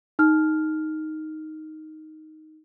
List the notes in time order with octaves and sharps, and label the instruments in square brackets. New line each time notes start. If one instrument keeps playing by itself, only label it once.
[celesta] D#4 F6